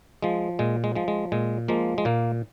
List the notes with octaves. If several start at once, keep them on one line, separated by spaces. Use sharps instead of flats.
F3 G#3
A#2 G#3
G#3
F3 G#3
G#3
A#2 G#3
F3 G#3 A#3
G#3
A#2 A#3